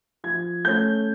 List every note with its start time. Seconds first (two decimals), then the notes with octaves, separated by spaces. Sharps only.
0.24 F3 G#6
0.64 A3 C#4 G6